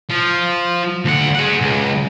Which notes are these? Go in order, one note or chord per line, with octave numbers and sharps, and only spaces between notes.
F3
D2 F#5
G#4 F#5
C#2